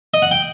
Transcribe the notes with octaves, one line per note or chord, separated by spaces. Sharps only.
D#5
F#5
G5